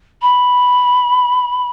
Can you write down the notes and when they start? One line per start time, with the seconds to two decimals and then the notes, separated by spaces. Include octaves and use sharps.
0.22 B5